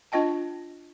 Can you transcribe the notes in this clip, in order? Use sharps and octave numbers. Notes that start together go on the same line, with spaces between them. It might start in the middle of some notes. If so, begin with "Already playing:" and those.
D4 F4 D#5 G5 A5